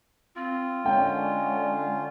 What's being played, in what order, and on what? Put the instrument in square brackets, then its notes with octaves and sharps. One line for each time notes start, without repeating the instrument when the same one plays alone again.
[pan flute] C4 [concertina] F4
[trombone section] D3 C#4 [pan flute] G#3 [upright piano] G5